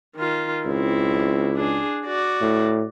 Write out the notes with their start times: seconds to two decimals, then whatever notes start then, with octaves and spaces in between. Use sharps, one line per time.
0.16 D#3 F4
0.66 C#2 C4 E4
1.54 D4 G#4
2.06 F#4 D5
2.41 A2